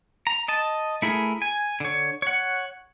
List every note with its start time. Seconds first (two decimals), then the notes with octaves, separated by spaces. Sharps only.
0.27 A#5
0.48 D#5 A5
1.02 A3 E4 G#4 A#4
1.42 G#5
1.80 D3 C#5
2.22 C#5 F#5